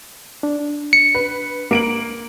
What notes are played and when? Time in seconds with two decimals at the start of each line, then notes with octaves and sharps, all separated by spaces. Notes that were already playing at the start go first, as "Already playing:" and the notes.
0.43 D4
0.93 C#7
1.15 B4
1.71 A#3 D7 F#7